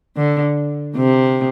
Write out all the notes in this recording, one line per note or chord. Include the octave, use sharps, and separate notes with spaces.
D3
C3